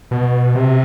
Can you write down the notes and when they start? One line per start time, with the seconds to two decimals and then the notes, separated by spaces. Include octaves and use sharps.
0.11 B2
0.55 C3